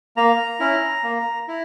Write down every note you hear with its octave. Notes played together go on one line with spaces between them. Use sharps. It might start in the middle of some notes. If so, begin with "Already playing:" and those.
A#3 A#5
C#4 E4
A#3
E4